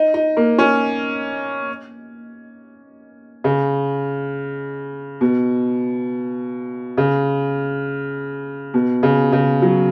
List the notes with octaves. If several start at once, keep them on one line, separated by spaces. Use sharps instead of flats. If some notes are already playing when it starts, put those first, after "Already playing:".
Already playing: D#4
D#4
A#3
C#4
C#3
B2
C#3
B2
C#3
C#3
F#3